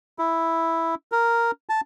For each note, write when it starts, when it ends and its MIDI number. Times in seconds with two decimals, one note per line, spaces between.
0.19 0.95 64
1.12 1.51 70
1.69 1.81 81